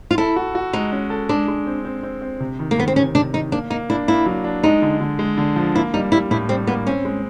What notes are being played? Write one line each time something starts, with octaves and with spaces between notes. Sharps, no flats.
F4
E4 A4
F#4
F#4
G#3 D#4
C#4
A4
G#3 D4
G#3
C4
C4
C4
C4
C3
D#3
A#3
D#3 B3
C4
C3 C#4
C3 D4
D#3 D#4
A#3 D4
A#3 D#4
D4 E4
A#3 E4
F#3
D4
G#3 D#4
D3
D3
G#3
D3
F3
A#3 E4
G3 D#4
G3 E4
A2 E4
G3 C4
A#3 B3
C4 C#4
G#3